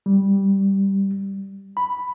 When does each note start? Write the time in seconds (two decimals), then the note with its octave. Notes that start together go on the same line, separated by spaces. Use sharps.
0.06 G3
1.77 B5